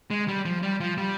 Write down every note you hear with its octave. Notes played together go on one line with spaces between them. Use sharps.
G#3
G3
F3
G3
F3
G3